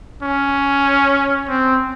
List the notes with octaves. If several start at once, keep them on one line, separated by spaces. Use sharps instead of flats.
C#4
C4